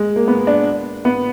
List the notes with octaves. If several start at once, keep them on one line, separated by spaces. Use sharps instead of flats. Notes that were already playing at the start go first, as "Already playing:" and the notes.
Already playing: G#3
A#3
B3
D4
B3